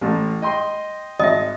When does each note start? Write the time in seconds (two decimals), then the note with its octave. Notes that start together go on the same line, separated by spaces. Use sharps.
0.01 A1 A2
0.42 D#5 G5 C6
1.19 G#1 D#5 E5 D#6